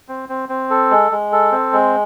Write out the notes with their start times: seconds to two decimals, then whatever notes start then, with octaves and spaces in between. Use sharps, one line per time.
0.09 C4
0.29 C4
0.49 C4
0.71 A4
0.91 G#3
1.12 G#3
1.33 A4
1.52 C4
1.73 G#3